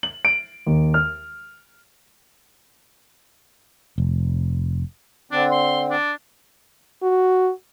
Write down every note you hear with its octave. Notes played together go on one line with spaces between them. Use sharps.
F#7
D7
D#2
F6
F1
D3 C4 D4
C6
D4
F#4